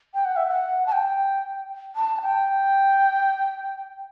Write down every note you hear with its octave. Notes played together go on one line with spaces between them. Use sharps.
G5
F#5
E5
F#5
A5
G5
A5
G5